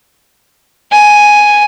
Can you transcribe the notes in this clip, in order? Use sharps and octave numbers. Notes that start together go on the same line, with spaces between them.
G#5